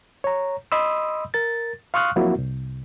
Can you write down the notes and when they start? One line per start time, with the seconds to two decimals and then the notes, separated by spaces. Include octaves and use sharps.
0.24 C#5 A#5
0.72 D#5 B5 C6 D#6 E6
1.34 A#4 A6
1.94 F5 C6 C#6 D#6 F6 F#6
2.16 F3 F#3 A#3 C4 E4 F#4
2.38 C2